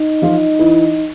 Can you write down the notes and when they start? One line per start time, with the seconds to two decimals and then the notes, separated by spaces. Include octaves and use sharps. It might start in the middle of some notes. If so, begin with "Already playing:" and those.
Already playing: D#4
0.22 F3 F4
0.59 E3 E4